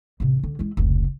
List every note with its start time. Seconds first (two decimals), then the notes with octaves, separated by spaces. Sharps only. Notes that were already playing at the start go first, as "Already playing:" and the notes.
0.20 A1 C3
0.43 D3
0.59 G#3 E4
0.77 F1 C#2